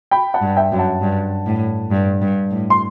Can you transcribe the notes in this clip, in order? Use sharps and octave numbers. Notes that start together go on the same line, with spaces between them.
G5 B5
F#5 A5
G2
E5 G5
F#2
F#5 A5
G2
A2
G2
G2
A2
C6